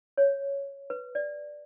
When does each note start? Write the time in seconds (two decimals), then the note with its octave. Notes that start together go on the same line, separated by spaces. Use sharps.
0.17 C#5
0.90 B4
1.15 D5